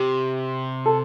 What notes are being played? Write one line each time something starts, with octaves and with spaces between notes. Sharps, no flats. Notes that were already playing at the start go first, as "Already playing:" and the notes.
Already playing: C3 G4
A4